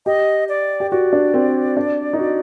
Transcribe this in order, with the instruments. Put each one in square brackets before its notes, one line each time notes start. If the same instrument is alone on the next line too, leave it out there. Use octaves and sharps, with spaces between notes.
[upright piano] G4 [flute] D#5
[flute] D5
[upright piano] G4
[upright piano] F#4 [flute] D5
[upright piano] D4
C4
D4
D#4
F#4